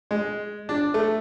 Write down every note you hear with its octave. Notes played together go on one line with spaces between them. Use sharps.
G#3
D4
A3